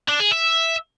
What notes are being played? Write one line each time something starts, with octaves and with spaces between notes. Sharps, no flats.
D4
G#4
E5